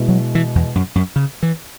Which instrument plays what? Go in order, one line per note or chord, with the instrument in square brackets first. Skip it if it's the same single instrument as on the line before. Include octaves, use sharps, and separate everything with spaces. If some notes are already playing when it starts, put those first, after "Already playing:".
Already playing: [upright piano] B2 G#3 E4
[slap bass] F#3
E3
E2
F#2
F#2
C#3
E3